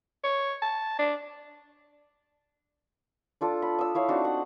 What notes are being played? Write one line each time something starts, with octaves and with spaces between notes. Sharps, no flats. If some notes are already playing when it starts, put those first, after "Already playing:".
C#5
A5
D4
D4 F4 A4 D6
B5
D#6 E6
E4 C#5 F5
C4 D4 D#4 F#4
F#5